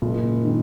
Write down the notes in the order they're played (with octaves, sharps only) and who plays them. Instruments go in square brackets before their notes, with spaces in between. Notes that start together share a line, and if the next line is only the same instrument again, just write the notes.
[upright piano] F#1 [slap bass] A#2
[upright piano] D#3